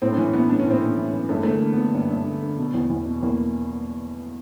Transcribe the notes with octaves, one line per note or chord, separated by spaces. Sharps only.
A2 C4
D4
E3 C#4
E3 B3
A2 D4
C#4
A2 C4
A2 C#4
E3
E3
G2 A3
D3 A3
A#3
D3
B3
D3
G2
G2
D3
D3
B2
E2
E2
B2
E2 A#3